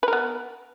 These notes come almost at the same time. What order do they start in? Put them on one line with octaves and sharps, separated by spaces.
B4 A#4 B3